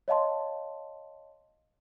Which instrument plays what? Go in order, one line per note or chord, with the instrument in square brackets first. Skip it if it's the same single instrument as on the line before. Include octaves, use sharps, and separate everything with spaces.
[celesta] C#5 D#5 F5 A5 C6